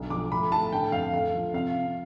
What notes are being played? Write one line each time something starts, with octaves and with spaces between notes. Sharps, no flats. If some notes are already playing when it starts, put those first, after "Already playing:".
Already playing: B1 D3
F3 D6
A2 B5
A2 A5
D3 G5
F2 F5
A3 F5
F3
C3 F5
C3